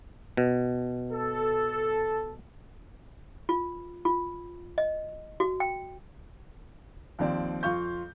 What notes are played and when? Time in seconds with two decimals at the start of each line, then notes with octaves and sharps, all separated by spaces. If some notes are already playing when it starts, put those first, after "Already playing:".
0.37 B2
1.12 A4
3.49 F4
4.05 F4
4.78 D#5
5.40 F#4
5.60 G5
7.19 D#2 F3 C4 D5
7.63 F2 F4 F5 C#6 G6